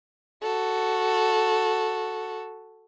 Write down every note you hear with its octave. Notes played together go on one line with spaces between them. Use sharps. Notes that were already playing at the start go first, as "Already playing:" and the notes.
F#4 A4